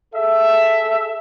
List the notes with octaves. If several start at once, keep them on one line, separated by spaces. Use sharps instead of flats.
G#4 A4 E5